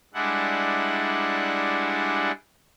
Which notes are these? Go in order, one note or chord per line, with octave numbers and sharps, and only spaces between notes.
G3 G#3 D4 E4 F#5